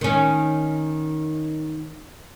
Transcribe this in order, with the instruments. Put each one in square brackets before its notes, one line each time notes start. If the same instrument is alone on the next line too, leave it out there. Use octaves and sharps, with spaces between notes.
[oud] D#3 C#4